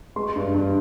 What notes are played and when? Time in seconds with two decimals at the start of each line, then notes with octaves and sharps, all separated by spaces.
0.16 G#3 C6
0.36 G2
0.54 G2